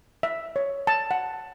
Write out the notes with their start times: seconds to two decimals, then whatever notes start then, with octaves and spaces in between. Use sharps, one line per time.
0.23 E5
0.56 C#5
0.87 A5
1.11 F#5